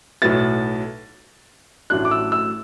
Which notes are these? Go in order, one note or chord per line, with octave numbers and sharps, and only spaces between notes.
B1 A2 F#3 B3 A6
A1 A2 F#3 A3 D4 F#6
D6
E6
E6